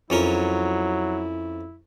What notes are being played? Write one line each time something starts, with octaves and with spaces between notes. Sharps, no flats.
F2 F#3 C#4 E4 A#4